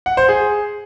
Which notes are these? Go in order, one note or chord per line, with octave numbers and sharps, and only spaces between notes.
F#5
C5
G#4